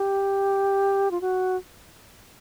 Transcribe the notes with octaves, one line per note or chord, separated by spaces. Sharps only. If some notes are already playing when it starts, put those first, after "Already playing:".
Already playing: G4
F4
F#4